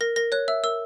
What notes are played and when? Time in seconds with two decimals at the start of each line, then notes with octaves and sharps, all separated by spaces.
0.01 A#4 A#6
0.16 A#4 A#6
0.32 C#5 F#6
0.48 E5 E6
0.64 A#4 E6